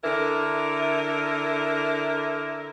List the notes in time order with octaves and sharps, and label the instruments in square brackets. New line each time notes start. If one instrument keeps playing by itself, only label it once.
[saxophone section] D3 E4 A#4